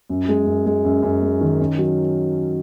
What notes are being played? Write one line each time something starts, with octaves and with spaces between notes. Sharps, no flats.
F#2
G#3
F#2
G#3
F#2
F#2
G#3
D#3
C#4
F#3